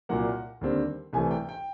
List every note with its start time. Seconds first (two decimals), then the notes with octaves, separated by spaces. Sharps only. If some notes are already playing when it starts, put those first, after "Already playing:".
0.09 C2 A#2 F#3 A#3 F#5
0.61 D#2 D3 G3 C4
1.13 C2 C3 E3 A3 G#5
1.31 G5
1.49 G5